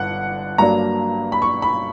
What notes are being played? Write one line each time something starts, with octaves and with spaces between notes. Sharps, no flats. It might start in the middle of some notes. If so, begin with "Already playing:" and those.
Already playing: G1 D3 F#5
G2 F#3 A#3 D4 A#5
B5
C#6
B5